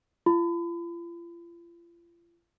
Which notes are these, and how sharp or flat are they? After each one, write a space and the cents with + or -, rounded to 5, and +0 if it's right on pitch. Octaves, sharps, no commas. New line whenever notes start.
F4 -40 B5 +35